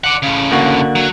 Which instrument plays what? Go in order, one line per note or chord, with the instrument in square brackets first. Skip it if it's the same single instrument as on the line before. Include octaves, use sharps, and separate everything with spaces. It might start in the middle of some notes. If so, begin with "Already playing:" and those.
[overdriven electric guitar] D5 F#5
A2 C#3
[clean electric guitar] D3 A#3 F#4
[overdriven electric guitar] F#3